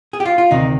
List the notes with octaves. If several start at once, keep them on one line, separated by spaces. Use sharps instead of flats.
G#4
G4
F4
F4
D2 C3 D#3 D#4